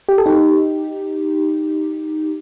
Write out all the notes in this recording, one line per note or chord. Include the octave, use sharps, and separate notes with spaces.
G4
A4
D#4 G4